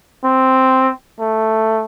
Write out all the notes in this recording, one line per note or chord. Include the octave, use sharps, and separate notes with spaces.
C4
A3